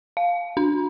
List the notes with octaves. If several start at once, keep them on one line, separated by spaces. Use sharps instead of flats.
F5
D4